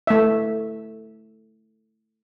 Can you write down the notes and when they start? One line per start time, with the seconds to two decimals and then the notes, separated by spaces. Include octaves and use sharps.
0.07 A3 E5